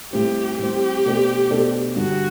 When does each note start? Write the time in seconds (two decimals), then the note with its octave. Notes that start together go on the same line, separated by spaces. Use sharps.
0.13 A2 G3 C4 G4
0.59 A2 G3 C4 G4
1.05 B2 A3 D4 A4 C5
1.50 B2 A3 D4 A4 C5
1.96 G2 D3 G3 F#4